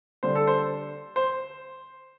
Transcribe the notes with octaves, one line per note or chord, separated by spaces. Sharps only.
D3 G3 D4 C5
A4
C5
C5